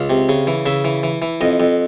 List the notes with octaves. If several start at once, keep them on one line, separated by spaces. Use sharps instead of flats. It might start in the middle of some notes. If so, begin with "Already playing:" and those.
Already playing: C#2 F5
C3
C#3
E3
C#3 E5
E3
E3
E3
F2 D#5
F2